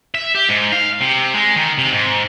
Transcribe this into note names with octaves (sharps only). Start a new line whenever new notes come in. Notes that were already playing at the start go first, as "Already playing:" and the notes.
E5
G4
G#2
F5
C3
G#3
D#3
C3
G#2